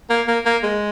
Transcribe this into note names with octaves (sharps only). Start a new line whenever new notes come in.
A#3
A#3
A#3
G#3